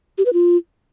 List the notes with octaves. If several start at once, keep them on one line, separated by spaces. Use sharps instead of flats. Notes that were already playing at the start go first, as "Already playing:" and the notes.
G4
B4
F4